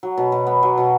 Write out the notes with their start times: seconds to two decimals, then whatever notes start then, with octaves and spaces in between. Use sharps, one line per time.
0.03 F#3
0.17 B2
0.32 B2
0.47 B3
0.63 F#3
0.78 B2